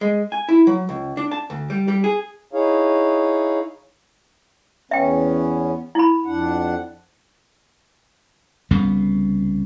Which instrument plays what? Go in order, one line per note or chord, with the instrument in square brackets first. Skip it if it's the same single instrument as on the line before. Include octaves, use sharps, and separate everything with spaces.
[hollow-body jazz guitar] G#3
G#5
E4
F#3
C#2
D4
A5
D2
G3
G3
G#4
[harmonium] D#4 E4 G#4 C#5 F5
[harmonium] E2 B3 C#4 [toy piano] E5 G5
[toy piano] E4 B5
[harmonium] F2 D4 F#5
[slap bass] C2 C#3 G3 B3